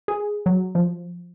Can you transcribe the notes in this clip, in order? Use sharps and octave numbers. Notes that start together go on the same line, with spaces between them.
G#4
F#3
F3